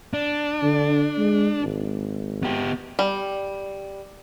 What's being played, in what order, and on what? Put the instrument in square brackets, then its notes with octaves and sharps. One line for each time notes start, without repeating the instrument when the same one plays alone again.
[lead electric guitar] D4
[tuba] D3
G#3
G#1
[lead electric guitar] B3 G4
[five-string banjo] G3